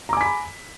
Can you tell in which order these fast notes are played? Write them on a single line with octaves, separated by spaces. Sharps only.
A#5 D6 G#5 B6 B5